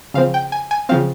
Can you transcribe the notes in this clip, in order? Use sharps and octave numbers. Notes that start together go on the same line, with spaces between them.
C#3 F3 C4 F5
G5
G#5
G#5
C#3 F3 C4 F5